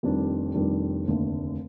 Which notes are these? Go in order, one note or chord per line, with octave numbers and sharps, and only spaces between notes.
F1 F2 D#3 G3 D4
F1 F2 D#3 G3 D4
F1 D#2 D3 A3